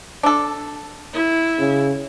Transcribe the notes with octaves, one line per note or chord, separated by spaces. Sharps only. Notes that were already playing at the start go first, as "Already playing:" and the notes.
D4 A4
E4
C#3